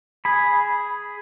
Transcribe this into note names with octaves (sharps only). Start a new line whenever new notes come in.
G#4 B5